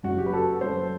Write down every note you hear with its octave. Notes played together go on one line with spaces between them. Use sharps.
F#1 F#2 F#3 F#4
G4
B4
F#4 A4
F#1 F#2 F#3 A4 C5